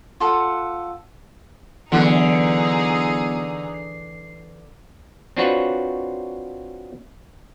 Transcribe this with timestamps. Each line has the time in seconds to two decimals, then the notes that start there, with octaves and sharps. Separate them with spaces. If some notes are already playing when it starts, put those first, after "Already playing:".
0.20 F4 A4 F#5
1.92 D3 E3 F#3 B3 D#4 E4 G#4
3.74 C7
5.37 C4 D4 F4 F#4 B4 C#5